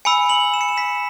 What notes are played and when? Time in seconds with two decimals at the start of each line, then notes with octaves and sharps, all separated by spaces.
0.05 G#5 B5 E6 C#7
0.29 F#7
0.54 E7
0.61 C#7
0.69 E7
0.78 B6